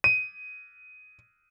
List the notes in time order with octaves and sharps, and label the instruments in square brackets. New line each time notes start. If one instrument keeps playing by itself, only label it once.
[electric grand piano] D#7